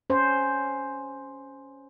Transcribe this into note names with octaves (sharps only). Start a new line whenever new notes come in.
C#4 C5